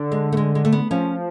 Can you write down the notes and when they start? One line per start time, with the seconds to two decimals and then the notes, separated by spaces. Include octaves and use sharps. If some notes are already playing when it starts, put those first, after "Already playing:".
Already playing: D3
0.12 G#3
0.32 A3
0.37 G#3
0.55 G#3
0.65 A3
0.72 B3
0.91 F3 C#4